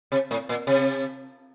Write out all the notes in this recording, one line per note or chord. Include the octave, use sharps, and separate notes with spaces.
C3
A2
A#2
C3